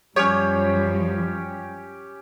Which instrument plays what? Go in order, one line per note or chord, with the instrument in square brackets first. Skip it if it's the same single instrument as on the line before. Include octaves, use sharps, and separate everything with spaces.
[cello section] F#2 F3 G3 [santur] C#4 G4 [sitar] C#5